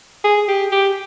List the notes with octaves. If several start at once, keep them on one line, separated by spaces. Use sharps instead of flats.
G#4
G4
G4